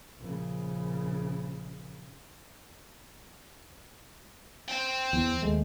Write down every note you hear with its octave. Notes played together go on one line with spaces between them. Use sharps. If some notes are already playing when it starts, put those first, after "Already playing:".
A#1 C#3
C5 G5
E2
D#2 G#3 A3